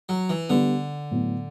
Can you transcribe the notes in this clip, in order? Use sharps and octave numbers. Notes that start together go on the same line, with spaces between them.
F#3
E3
D3 G3 B3 D4
A2 F#3 B3